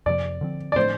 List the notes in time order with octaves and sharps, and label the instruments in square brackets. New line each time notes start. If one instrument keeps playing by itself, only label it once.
[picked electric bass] F2 C3 F3 [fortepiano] D5
[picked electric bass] D3 F3 C4
[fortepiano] D5
[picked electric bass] A2 F3 A3 D4 [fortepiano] C5